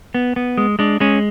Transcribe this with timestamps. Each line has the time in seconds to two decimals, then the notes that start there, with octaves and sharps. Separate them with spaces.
0.15 B3
0.36 B3
0.58 G#3
0.79 G#3 D4
1.00 G#3 C#4